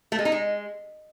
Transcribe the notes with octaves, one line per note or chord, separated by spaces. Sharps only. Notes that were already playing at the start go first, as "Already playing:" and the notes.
A3
G#3
D#4
G#3